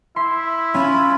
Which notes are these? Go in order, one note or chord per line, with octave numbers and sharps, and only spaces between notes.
E4 E5 C6
C#4 F4 B5